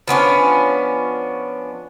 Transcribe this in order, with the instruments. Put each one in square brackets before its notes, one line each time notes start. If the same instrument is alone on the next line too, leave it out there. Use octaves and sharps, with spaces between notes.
[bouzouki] F3 B3 C#4 D4